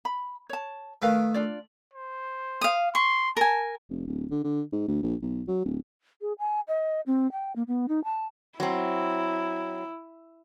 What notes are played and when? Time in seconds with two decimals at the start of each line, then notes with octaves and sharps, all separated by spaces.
0.05 B5
0.49 C#5 A5
1.02 D#3 A3 A#4 B4 F5
1.34 D4 F4 D5
1.93 C5
2.61 F5 D#6
2.95 C6 C#6
3.37 A#4 G#5 A5
3.90 F1
4.07 D1
4.31 D3
4.44 D3
4.73 G#2
4.88 D2
5.02 A#1
5.22 B1
5.48 F#3
5.65 D1
6.21 G#4
6.39 G#5
6.68 D#5
7.07 C4
7.32 G5
7.56 A#3
7.68 B3
7.88 D#4
8.04 A5
8.60 F#3 C4 E4